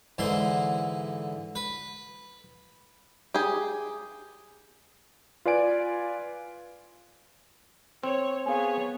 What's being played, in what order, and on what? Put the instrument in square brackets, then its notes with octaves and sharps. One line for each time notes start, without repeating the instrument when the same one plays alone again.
[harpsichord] G#2 D3 E3 C6
B4
[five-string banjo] G4 G#4
[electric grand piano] F4 B4 D5 G#5 D7
[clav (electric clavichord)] C4 [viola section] C#5
[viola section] B3 G#4 C#5 [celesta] F5 G#5